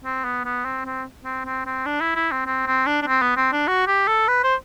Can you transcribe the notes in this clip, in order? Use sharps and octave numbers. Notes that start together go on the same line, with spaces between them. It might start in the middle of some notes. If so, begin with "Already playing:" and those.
C4
B3
B3
C4
C4
C4
C4
C4
D4
E4
E4
C4
C4
C4
D4
D4
C4
B3
C4
D4
F#4
G4
A4
B4
C5